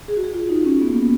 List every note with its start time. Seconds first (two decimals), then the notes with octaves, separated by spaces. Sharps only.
0.08 G#4
0.17 F#4
0.24 G#4
0.34 F4
0.50 D#4
0.65 C#4
0.81 B3
0.90 A#3